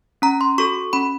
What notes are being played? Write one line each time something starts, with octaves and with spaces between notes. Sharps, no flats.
C#4 A#5
C6
F#4 A4 C#6
C#4 B5